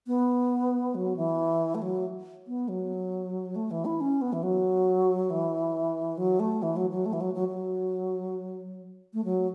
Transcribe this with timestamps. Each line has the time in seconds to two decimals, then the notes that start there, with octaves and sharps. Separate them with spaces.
0.07 B3
0.95 F#3
1.16 E3
1.75 A3
1.82 F#3
2.47 B3
2.68 F#3
3.56 A3
3.71 E3
3.85 E4
4.00 C#4
4.21 B3
4.33 E3
4.43 F#3
5.30 E3
6.17 F#3
6.39 A3
6.62 E3
6.76 F#3
6.91 F#3
7.06 A3
7.13 E3
7.21 F#3
7.34 F#3
7.48 F#3
9.13 A3
9.24 F#3